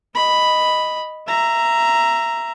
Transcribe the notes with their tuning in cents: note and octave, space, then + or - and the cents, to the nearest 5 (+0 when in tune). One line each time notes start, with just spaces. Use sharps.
D#5 +0 B5 +0
E5 +20 A#5 +0